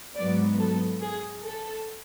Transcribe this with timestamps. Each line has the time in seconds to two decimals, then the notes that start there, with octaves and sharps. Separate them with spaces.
0.16 G#2 F#3 B3 D5
0.59 A4
1.02 G#4
1.45 A4